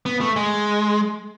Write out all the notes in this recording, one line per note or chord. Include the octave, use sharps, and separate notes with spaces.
B3
A3
G#3